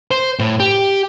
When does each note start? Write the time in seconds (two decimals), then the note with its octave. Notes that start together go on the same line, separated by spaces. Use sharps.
0.11 C5
0.39 A2
0.60 G4